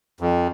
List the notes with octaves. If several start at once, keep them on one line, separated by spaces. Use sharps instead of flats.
F2